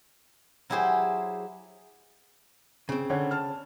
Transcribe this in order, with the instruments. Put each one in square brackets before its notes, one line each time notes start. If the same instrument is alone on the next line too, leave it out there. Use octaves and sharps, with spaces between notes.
[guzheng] F#3 E4 G4 G#4 C5
[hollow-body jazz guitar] C#3 C4
[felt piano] D3 C#4
A5 F6